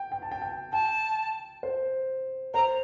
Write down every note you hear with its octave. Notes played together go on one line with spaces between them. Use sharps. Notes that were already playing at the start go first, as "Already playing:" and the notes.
Already playing: G5
G5
A5
G5
G5
G5 A5
C5
C5 A#5